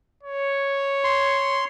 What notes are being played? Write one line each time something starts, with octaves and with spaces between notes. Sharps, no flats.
C#5
C6